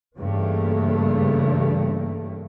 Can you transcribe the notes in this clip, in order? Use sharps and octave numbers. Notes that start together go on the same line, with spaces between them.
G2 C#3 E3 A3 A#3